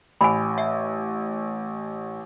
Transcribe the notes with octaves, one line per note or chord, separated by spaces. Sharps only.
A1 G#5 B5
E5